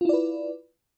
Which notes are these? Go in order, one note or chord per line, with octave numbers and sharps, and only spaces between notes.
E4 F4 B4 D5